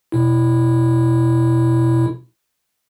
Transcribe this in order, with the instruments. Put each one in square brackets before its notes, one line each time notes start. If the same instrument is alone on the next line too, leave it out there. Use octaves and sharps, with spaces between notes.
[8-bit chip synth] B2 E4